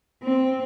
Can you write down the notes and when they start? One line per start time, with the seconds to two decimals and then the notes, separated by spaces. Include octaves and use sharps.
0.23 C4